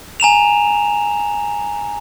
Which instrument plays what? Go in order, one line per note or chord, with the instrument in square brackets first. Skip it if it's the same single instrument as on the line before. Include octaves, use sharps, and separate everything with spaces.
[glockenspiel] G#5 A#5 E7 F7